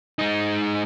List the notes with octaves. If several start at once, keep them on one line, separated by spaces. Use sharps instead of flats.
G#3 D#4